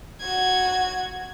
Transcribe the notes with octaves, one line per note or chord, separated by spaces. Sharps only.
F#4 G#6